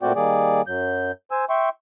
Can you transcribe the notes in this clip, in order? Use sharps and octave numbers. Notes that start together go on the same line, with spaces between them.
A#2 A3 C4 F#4 D5 G5
D#3 G3 A#3 G#4 D5
F#2 F#3 G6
C5 G#5 E6
E5 G5 C6 C#6